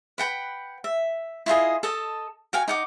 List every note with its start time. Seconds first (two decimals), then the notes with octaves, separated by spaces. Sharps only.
0.18 B4 F#5 G5 B5
0.84 E5
1.46 E4 F4 G#4 D#5
1.83 A4 D#5 A5
2.53 F#4 F5 G5 G#5
2.68 D#4 F#5 D6